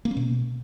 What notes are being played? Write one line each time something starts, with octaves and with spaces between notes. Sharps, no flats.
A#3
C#4
B2